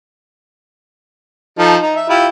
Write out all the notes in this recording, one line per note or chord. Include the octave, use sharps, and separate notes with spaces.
F3 D#4 A4
D#4
E5
E4 F4 G4